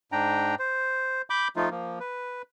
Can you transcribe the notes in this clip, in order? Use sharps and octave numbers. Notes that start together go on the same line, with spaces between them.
G#2 D4 G5 A#5
C5
B5 D6 G6
F3 A3 D#4 F4
F3 A#3
B4